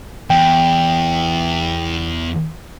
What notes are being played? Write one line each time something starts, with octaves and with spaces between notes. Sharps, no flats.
E2 G5